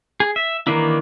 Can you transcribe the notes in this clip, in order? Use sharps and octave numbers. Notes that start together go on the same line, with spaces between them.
G#4
E5
D#3 E3 A#3 D4 E4